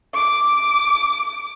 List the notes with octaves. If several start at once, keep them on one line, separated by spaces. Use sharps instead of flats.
D6